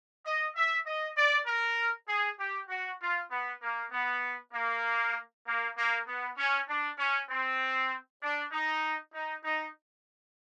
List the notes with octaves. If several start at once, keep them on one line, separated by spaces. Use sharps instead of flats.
D#5
E5
D#5
D5
A#4
G#4
G4
F#4
F4
B3
A#3
B3
A#3
A#3
A#3
B3
C#4
D4
C#4
C4
D4
D#4
D#4
D#4